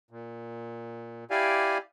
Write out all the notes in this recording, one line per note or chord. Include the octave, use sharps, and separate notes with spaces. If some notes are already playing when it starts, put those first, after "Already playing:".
A#2
E4 G4 D5 F5 G#5